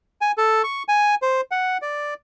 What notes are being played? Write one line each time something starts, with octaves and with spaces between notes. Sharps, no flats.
G#5
A4
C#6
G#5
C5
F#5
D5